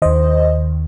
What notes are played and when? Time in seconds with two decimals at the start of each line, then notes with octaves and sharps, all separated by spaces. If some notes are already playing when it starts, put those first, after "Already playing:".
0.02 D#2 D#3 C5 D#5